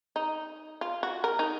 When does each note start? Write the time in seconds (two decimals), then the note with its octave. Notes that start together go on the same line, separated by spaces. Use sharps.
0.16 D#4
0.81 F4
1.03 F#4
1.24 A#4
1.39 D#4